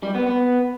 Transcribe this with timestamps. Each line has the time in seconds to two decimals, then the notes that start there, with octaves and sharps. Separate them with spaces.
0.03 G3
0.15 B3
0.27 B3